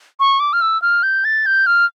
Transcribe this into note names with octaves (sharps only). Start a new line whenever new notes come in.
C#6
D6
F6
E6
F6
G6
A6
G6
F6